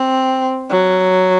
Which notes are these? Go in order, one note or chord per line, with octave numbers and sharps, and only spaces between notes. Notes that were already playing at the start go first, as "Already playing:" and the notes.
Already playing: C4
F#3